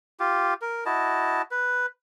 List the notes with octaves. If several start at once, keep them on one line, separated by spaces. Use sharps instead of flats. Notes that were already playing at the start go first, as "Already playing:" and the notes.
F4 G4
A#4
E4 F#4 D#5 A5
B4